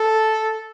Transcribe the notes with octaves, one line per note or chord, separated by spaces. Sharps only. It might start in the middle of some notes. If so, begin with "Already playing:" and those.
Already playing: A4